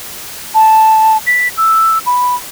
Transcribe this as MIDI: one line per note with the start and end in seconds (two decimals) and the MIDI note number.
0.55 1.18 81
1.27 1.48 95
1.57 1.99 88
2.06 2.35 83